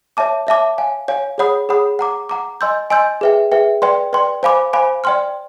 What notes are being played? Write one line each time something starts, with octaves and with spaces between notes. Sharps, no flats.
C#5 E5 A5 D6
C#5 E5 A5 D6
C#5 F5 G#5
C#5 F5 G#5
G#4 C#5 F#5 B5 D#6
G#4 C#5 F#5 B5 D#6
F#5 A#5 D6
F#5 A#5 D6
D#5 G#5 C6 E6 G6
D#5 G#5 C6 E6 G6
G#4 B4 E5 G5
G#4 B4 E5 G5
B4 D5 G5 C6
B4 D5 G5 C6
C5 F5 G#5 B5 D6
C5 F5 G#5 B5 D6
D5 G5 C6 F6